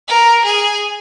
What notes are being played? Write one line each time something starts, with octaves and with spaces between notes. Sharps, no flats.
A#4
G#4